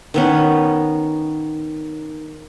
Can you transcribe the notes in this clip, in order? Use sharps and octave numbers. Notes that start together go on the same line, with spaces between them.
D#3 B3 C#4